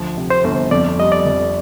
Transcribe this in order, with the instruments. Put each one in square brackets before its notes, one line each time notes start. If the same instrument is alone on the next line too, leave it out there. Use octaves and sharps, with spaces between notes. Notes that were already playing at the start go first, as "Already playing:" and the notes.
Already playing: [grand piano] D2 F3
C3
[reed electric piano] C5
[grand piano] G1
[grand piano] F2 [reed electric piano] D5
[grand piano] G3 [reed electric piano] D#5
[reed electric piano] D5
[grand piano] F2